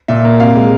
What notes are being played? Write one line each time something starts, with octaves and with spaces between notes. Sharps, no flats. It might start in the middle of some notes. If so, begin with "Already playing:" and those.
A#2 E5
A#3
C3 F5
G#3